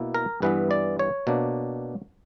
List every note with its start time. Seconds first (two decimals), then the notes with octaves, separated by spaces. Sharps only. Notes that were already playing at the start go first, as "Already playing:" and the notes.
Already playing: B2 A#3 E4
0.15 A#4
0.42 G2 E3 B3 E4 B4
0.71 D5
0.99 C#5
1.27 B2 A#3 D4